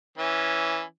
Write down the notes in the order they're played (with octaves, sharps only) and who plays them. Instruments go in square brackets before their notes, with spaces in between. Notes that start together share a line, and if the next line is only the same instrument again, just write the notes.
[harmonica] E3 C#4